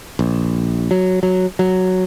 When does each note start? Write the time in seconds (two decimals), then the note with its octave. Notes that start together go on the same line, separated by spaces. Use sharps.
0.19 A#1
0.91 F#3
1.23 F#3
1.59 F#3